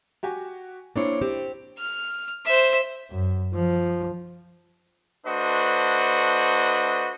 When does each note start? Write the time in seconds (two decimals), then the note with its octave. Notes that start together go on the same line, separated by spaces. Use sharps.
0.23 F#4 G4 G#5
0.96 A#3 C4 D4 E4 C#5
1.22 C4 G4
1.78 F6
2.45 C5 E5
3.11 F#2
3.54 F3
5.26 A3 D4 F#4 B4 C5 D#5